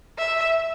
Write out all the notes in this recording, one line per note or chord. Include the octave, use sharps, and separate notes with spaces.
E5